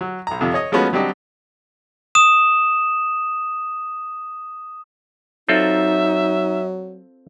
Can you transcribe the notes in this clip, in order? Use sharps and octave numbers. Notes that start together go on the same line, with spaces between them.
F#3
B1 A#5
F2 C3 F3
C#5 D#5 D#6
F3 G#3 A3 B3 C#4 F#4
F#3 G3 C4 D4 G4 D#5
D#6 E7
F#3 C4 D#4 F4 A4 E5